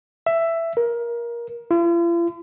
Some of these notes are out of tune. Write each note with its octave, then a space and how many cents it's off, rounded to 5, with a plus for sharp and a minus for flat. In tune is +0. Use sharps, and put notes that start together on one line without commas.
E5 +10
A#4 +20
F4 -45